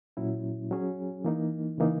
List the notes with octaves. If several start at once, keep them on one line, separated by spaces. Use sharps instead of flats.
A#2 F#3 C#4 E4
F#3 C#4 G#4
E3 A#3 D#4
C#3 E3 A#3 D#4